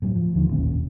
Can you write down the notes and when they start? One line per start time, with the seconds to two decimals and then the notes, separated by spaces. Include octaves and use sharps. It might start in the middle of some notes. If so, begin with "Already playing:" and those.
0.02 A2 F#3
0.15 F3
0.35 D#2 D3 D#3 F3
0.49 G#1 D#2 A#2 C#4
0.71 E1